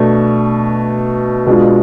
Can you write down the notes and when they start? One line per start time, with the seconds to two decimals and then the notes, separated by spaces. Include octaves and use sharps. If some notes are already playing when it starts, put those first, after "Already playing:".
Already playing: B2 A3 D4
1.47 B2 G#3 D4 F4